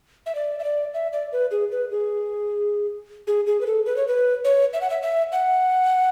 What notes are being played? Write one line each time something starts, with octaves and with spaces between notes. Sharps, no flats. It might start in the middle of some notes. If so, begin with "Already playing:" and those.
E5
D5
E5
D5
E5
D5
B4
G#4
B4
G#4
G#4
G#4
B4
A4
B4
C#5
B4
C#5
E5
F#5
E5
E5
F#5